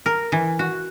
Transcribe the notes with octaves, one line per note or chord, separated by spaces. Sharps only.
A#4
E3
F#4